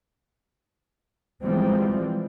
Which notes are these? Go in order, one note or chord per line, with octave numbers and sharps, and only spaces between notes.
E3 F3 G3 G#3 C4